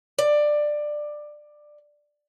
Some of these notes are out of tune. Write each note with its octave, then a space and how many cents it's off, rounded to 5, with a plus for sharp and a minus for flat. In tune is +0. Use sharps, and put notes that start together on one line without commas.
D5 +15